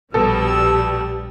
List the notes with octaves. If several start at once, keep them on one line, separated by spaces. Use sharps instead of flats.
A#1 B2 G3 A4 E6